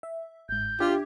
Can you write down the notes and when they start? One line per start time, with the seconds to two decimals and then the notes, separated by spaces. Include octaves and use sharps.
0.03 E5
0.49 G1 G#2 G6
0.80 D4 F4 G4 E5 G#6